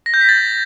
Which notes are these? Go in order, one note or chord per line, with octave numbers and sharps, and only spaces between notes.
A#6
G6
B6
A6